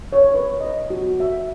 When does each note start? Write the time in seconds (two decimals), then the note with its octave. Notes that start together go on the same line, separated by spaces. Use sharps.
0.13 C#5
0.34 B4
0.60 D#5
0.90 F#4
1.20 E5